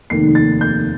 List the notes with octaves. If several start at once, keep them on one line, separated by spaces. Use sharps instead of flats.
F1 D#2 D#3 C7
A6
G6